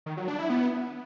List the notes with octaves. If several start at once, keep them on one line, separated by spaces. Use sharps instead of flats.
D#3
F#3
D4
E4
B3